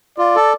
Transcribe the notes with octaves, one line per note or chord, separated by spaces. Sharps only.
F4 D5
A4